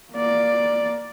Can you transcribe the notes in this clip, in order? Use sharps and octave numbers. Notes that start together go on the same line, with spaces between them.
A#3 D5